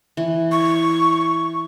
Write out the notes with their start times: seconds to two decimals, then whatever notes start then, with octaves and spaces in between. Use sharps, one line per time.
0.17 E3
0.52 C#6